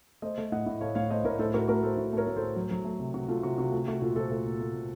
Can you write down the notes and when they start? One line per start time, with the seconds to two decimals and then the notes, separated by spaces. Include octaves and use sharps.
0.22 A3 C5 D#5
0.38 A3
0.52 A2 D#5 F#5
0.66 A2
0.81 A3 C#5 F5
0.95 A2 C#5 F5
1.10 A3 C5 D#5
1.24 A2 A#4 C#5
1.39 A2 A4 C5
1.54 A3 F#4 A#4
1.68 A3 F#4 A#4
1.83 A3 A4 C5
1.97 A2
2.13 A3 A#4 C#5
2.27 A2
2.36 A4 C5
2.42 A3
2.56 F#3
2.71 F#3
2.85 A3
3.00 C3
3.14 C3 F#4
3.29 A3 F4
3.43 C3 F#4
3.58 C3 F#4
3.72 A3 F4
3.88 A3 F#4
4.01 A#2 F4 A4
4.16 A#2 A4 C5
4.31 A3
4.46 A#2
4.60 A3
4.75 A#2